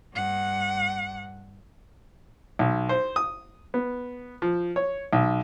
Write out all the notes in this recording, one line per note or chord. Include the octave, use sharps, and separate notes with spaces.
G2 F#5
B1
C5
D#6
B3
F3
C#5
B1